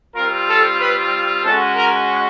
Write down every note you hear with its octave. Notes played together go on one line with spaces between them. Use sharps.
G3 C4 F4 A#4
A4
B4
G#3 C#4 F#4 A4
A#4